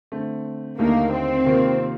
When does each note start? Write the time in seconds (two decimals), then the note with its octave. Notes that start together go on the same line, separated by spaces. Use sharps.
0.12 D3 A3 C4
0.79 D#2 D3 A3 A#3 D#4
1.12 C4
1.45 C3 D#3 A#3 F4